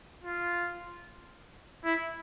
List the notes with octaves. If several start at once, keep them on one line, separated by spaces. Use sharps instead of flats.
F4
E4